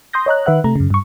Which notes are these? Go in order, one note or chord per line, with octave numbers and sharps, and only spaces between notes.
C6 D#6 G6 A#6
C#5 D#5 A#5 F#6
D#3 B4 E5 F#5 F#6
C3 A3 A#5
F#2 C#3
G2 C#6